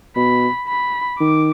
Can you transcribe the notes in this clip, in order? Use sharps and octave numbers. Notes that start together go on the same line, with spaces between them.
B2 B5
B5
D#3 D6